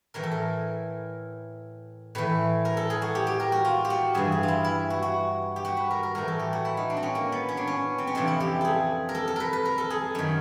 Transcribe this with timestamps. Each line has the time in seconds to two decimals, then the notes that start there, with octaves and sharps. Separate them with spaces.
0.14 A2 E3 A#4
0.23 A4
0.31 A#4
2.15 A2 E3 B4
2.65 A#4
2.77 A4
2.90 G#4
3.02 F#4
3.15 G4
3.27 G4
3.40 A#4
3.52 F#4
3.65 F4
3.85 G4
3.90 F#4
4.14 G2 E3 G#4
4.32 G#4
4.43 F4
4.48 E4
4.64 E4
4.90 F#4
5.02 F#4
5.56 G4
5.65 F#4
5.77 B4
5.91 A#4
6.03 A#4
6.15 A2 E3 A#4
6.28 A4
6.39 G4
6.53 F#4
6.65 E4
6.77 D#4
6.90 D4
6.97 C4
7.03 C#4
7.15 A#3
7.32 B3
7.49 C#4
7.57 D4
7.67 C#4
7.98 C4
8.07 C#4
8.15 F2 C3 E3 D4
8.27 E4
8.40 G4
8.61 G#4 A4
9.09 A#4
9.15 A4
9.28 A4
9.36 A#4 B4
9.53 B4
9.65 A#4
9.78 A4
9.90 G#4
10.15 F#2 D#3